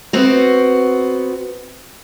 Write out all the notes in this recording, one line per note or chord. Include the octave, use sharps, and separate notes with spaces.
B3 C4 F#4